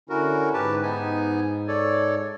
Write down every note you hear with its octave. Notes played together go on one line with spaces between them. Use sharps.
D3 C#4 E4 F#4 A#4
G#2 G4 B4 A5
B3 D#4 G#5
A4 C#5 D5